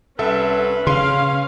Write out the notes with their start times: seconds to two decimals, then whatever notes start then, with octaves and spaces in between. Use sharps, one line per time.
0.19 C2 C#4 A4 B4 E5
0.87 C#3 C#4 F5 C6